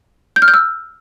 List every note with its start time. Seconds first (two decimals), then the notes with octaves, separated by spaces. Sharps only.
0.36 G6
0.42 F6
0.48 G6
0.54 E6